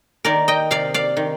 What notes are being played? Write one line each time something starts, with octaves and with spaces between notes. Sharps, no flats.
D#3 A#4 D5
D#5 G5
C3 D5 F5
D5 F5
D#3